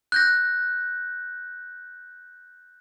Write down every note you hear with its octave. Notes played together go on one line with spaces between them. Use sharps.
F#6 G6 A#6